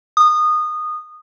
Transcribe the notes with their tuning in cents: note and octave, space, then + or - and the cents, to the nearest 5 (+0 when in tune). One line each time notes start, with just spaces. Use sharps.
D#6 -20